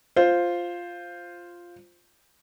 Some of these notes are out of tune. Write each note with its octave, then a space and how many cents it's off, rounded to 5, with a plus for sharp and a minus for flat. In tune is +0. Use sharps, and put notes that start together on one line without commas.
F4 +0 C5 +0